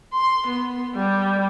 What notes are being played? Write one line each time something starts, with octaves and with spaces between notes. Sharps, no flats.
C6
B3
G3